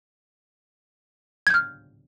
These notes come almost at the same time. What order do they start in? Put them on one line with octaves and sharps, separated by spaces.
G#6 G6 F6